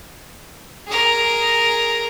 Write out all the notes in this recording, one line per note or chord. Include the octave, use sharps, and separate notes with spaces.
G#4 A#4